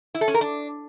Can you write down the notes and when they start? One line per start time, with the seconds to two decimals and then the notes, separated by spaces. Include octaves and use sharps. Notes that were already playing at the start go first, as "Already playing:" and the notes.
0.14 E4
0.21 A4
0.28 C#4
0.34 A#4
0.41 D4